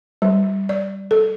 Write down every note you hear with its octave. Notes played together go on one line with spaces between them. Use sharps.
G3
D5
A4